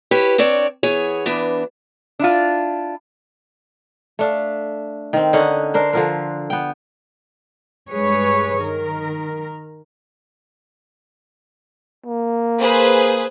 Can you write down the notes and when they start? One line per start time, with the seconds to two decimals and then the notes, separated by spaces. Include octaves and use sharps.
0.11 E4 G4 B4 C#5
0.38 C4 D4 C#5 D5
0.83 E3 B3 G#4 C#5
1.26 E3 B3 D4
2.19 D4 E4 F4
4.19 A3 D4 F5
5.13 D#3 C4
5.33 D3 C#4 D#4 F#5
5.74 D4 A#4 C5
5.93 D3 F3 A#4
6.50 B3 G5
7.89 G2 G#3 G#4 B4 C#5
8.58 D#3 A#4
12.06 A#3
12.60 G#4 B4 C5